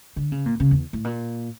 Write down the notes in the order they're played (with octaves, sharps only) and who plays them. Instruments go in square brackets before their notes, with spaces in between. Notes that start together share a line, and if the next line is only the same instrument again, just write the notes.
[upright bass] D3
C#3
A#2
C#3
E2
A2
A#2